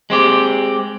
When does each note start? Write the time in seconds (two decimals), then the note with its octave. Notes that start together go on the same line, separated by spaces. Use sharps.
0.10 G#3 C4 G4